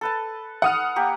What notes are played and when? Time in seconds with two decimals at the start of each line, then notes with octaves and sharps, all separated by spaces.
0.01 A4 B4 A5
0.62 F#5 D#6 F6
0.96 A#3 G4